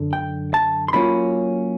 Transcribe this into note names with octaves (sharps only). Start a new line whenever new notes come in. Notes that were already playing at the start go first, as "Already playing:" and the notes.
Already playing: F#2 D3 F#3
G5
A5
C6
D3 F#3 A#3 C#4 F4 B5